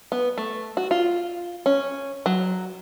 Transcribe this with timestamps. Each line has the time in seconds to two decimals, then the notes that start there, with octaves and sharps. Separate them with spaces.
0.12 B3
0.38 A3
0.77 F#4
0.91 F4
1.66 C#4
2.26 F#3